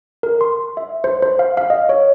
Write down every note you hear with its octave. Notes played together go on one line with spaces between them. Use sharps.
A#4
C6
E5
C5
C5
F5
F5
D#5
C#5